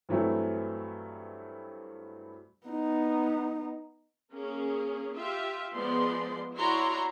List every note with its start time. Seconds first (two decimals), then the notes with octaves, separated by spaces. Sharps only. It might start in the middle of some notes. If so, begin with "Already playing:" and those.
0.09 G2 E3 F#3 A3 C4 E4
2.67 B3 D#4
4.32 A#3 C#4 G#4
5.16 F4 G4 E5
5.75 F3 G#3 B3 D5 C6
6.58 E4 F#4 C#5 D5 A#5 C6